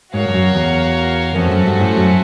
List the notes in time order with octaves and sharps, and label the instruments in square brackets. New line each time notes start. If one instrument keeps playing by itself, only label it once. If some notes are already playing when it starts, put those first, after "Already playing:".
[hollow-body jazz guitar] G#2 [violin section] F#4 A#4 C#5 F5
[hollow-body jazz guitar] G2
F#2
E2
[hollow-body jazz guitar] F2 [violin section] A3 C#4 F#4 A4 C5
[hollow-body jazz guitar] F#2
G2
A2
F#2